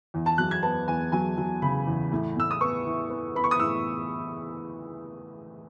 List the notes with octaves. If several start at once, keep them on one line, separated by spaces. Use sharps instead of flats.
E2
A5
F#3 F#6
G#6
B3 A5
E2 G#5
F#3 G#5
F#3
C#3 B5
E2
A2
A2 E6
D#6
B3 C#6
E3
B3
B3 B5
C#6
D#6
A2 E6